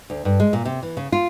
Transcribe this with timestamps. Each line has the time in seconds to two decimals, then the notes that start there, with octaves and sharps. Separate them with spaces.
0.10 D2
0.25 G2
0.40 G#3
0.53 A#2
0.65 C3
0.83 E3
0.97 C#3
1.12 F4